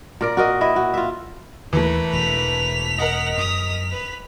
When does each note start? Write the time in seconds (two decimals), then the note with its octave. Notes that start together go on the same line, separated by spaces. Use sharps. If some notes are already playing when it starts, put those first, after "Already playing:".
0.21 A#2 A#4 D5
0.37 F#4 A#4 D#5
0.61 E4 D#5 E5
0.76 F#4
0.94 F4 E5
1.73 D#2 E3 A3 A#4 B4
2.13 E1 B6 F7
2.98 A#4 D#5 F#5
3.38 F#2 D#6
3.91 B4